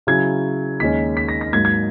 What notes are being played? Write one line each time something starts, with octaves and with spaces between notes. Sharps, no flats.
C#3 F#3 C#4 E4 G#6
D#2 D#3 G#3 C#4 B6
B6
A#6
A#6
G#2 F#3 A#3 G#6
G#6